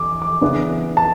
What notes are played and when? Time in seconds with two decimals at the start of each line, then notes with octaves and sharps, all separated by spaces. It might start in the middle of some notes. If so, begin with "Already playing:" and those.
Already playing: E2 D6
0.22 D6
0.41 C#3 E3 B3 D4
0.97 A5